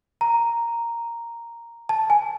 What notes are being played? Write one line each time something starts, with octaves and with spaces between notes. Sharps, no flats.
A#5
A5
G#5